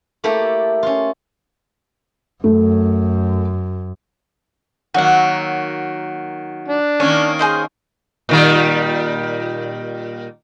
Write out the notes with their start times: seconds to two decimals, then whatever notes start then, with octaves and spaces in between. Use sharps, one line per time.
0.24 A3 A#3 E4 G4 A4
0.83 C#4 F4
2.44 F#2 A3
4.94 D#3 F#3 A#3 F#4 F#5
6.68 D4
7.00 D#3 A#3 C#4 C#5
7.39 G#4 C5 D#5
8.29 A#2 D#3 G3